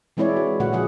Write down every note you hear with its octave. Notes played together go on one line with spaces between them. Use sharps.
E3 G#3 C4 E4 C#5 D5
F#4
A#2 D3 G#3 F#4 F#5
D3 F3 G#4 F#5